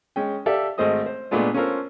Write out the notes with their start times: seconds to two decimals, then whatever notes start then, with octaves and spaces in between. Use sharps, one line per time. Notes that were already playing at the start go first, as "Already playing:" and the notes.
0.16 G#3 C#4 G5
0.46 G4 A4 D5 E5 F5
0.78 G#1 G#3 A3 C5 D#5 D#6
1.06 C5
1.31 A#2 G#3 A3 B3 D4 F4
1.54 C#4 F4 A4 A#4 C5